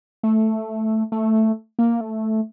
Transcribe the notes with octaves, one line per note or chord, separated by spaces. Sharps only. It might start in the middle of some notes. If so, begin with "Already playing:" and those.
A3
A3
A#3
A3